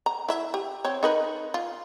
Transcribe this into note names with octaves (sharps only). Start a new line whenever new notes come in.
A#5
E4 E5
G4
C4 C#5
D#4 A#4 B4
F4